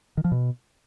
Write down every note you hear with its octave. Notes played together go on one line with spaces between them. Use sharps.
D#3
F3
B2